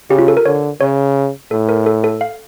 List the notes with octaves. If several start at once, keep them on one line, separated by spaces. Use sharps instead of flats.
C#3 G4
F4
A4
A#4
D3 C#5
C#3 C#5
A2 A4
A#4
A4
A4
F5